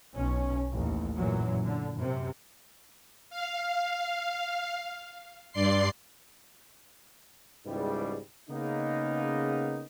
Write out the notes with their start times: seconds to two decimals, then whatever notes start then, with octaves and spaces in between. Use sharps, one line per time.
0.14 B1 C#4
0.70 A1 D#2
1.16 F#2 A#2 E3 F#3
1.63 D3
1.97 F#2 C3
3.30 F5
5.52 G2 D5 C6 C7
7.65 C#2 G#2 B2 E3 G3
8.49 C#3 A#3 B3 D#4